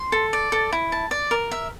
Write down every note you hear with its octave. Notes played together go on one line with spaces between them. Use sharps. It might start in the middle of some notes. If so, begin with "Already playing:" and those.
Already playing: C6
A4
D5
A4
E4
A5
D5
A#4
E5